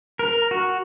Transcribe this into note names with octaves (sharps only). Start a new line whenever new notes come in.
A#4
F#4